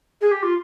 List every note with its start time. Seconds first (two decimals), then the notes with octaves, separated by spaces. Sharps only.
0.21 G#4
0.31 G4
0.42 F4